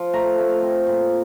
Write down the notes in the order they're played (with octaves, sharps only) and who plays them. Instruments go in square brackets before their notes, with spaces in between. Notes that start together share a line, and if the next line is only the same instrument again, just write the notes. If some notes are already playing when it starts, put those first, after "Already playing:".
Already playing: [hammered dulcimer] F3
A3 A#5
A3
C4
A#2